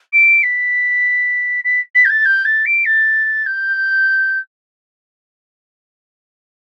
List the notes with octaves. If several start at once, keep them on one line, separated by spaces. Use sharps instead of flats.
D7
B6
B6
B6
G6
A6
G6
A6
D7
A6
G6